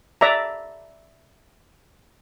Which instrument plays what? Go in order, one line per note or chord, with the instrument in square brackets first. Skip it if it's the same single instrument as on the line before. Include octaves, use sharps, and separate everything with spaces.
[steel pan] D5 E5 A#5